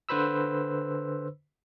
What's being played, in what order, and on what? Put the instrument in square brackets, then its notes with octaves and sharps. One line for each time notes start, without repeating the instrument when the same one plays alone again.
[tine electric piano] D3 B4 C5 B5 E6